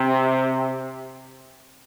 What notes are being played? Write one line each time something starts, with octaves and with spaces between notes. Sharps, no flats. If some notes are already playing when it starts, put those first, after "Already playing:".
Already playing: C3